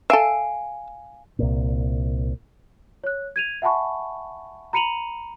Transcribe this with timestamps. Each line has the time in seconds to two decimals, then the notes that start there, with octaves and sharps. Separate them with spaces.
0.10 A4 E5 F5 G#5 D7
1.39 C2 A#2
3.04 C#5 F#6
3.36 G#6 D#7 F7
3.62 E5 F#5 G#5 A5 B5 C#6
4.73 A#5 B5 C#7 D#7 F7 F#7